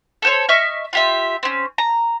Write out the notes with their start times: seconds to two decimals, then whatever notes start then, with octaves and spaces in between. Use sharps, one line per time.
0.22 A4 C5 C#5
0.49 D#5 E5 C#6 F6
0.93 F4 G4 E5
1.43 C4 C#4
1.78 A#5